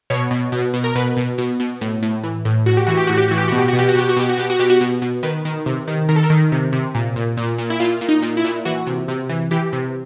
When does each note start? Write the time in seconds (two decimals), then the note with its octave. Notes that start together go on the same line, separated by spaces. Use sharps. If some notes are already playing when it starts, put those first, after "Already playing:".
0.10 B2 C#5
0.31 B2
0.52 B2
0.74 B2
0.84 A#4
0.95 B2 B4
1.17 B2
1.38 B2
1.60 B2
1.81 A2
2.03 A2
2.24 E3
2.45 A2
2.66 A2 F#4
2.77 G4
2.87 E3 F#4
2.97 G4
3.07 A2 F#4
3.17 G4
3.28 E3 F#4
3.38 G4
3.48 B2 F#4
3.58 G4
3.68 B2 F#4
3.79 G4
3.88 F#4
3.95 B2 G4
4.09 F#4
4.17 B2 G4
4.29 F#4
4.38 B2 G4
4.50 F#4
4.59 B2 G4
4.70 F#4
4.81 B2
5.02 B2
5.23 D#3 B4
5.45 D#3
5.66 C3
5.88 D#3
6.09 D#3 A#4
6.16 A4
6.23 A#4
6.30 D#3
6.52 C3
6.72 C3
6.95 A#2
7.16 A#2
7.37 A#2
7.58 A#2
7.70 E4
7.80 A#2 F4
8.01 A#2
8.09 D#4
8.22 A#2
8.37 E4
8.45 A#2
8.65 E3 F#4
8.87 C3
9.08 C3
9.29 E3
9.51 E3 G4
9.73 C3